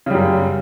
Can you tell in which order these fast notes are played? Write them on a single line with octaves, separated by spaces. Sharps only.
C#3 G3 F#2